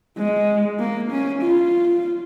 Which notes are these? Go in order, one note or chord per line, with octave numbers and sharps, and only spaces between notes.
G#3
A#3
C#4
F4